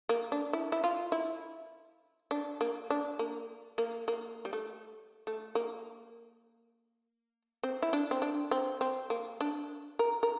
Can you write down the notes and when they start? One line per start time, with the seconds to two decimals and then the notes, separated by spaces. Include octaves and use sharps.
0.09 A#3
0.32 D4
0.53 E4
0.72 E4
0.84 F4
1.12 E4
2.31 D4
2.61 A#3
2.90 D4
3.19 A#3
3.78 A#3
4.08 A#3
4.45 G3
4.53 A3
5.27 A3
5.55 A#3
7.63 C4
7.82 E4
7.93 D4
8.11 C4
8.22 D4
8.51 C4
8.81 C4
9.10 A#3
9.41 D4
9.99 A#4
10.23 A#4